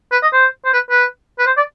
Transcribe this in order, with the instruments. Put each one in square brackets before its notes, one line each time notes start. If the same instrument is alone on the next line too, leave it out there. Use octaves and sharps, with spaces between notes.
[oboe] B4
D#5
C5
C5
B4
B4
B4
C5
D5